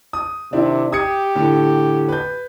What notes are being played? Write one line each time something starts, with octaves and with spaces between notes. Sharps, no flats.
D#6
C3 D#3 D4 E4
G4 D#6 G#6 C#7
A2 D3
B4 G6